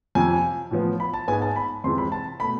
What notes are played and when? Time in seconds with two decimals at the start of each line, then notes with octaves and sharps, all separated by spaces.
0.15 F2 C3 F3 G#5
0.71 A2 F3 B3
1.00 B5
1.14 A5
1.28 G#2 G#3 B3 G#5
1.42 A5
1.56 B5
1.84 F2 C3 E3 G#3 C6
1.98 B5
2.12 A5
2.40 B2 A3 B5